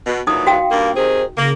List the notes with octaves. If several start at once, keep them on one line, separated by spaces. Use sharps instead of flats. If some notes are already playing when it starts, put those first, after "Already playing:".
B2
A#2 E3 F#3 D#4 D#6
F#4 F5 G5
G2 A#3
C3 D#3 G#4 C5
C#3 A#3